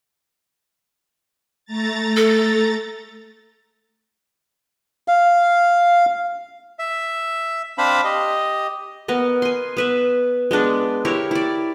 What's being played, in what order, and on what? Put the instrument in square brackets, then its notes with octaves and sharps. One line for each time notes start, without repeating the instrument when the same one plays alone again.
[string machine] A3 A#5 A6
[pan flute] A4
[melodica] F5
[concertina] E5
C4 D4 C5 F5 B5
G4 D#5
[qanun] B3 A#4 D#5
G#5 C6
B3 B4 E5
G#3 B3 D4 B4
E4 G4 A#4 C#5
E4 D5